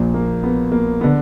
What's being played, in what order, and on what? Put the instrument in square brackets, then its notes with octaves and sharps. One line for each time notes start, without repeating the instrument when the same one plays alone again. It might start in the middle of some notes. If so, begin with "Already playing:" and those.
Already playing: [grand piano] A#1 A#2
A#3
B3
A#3
B3
D3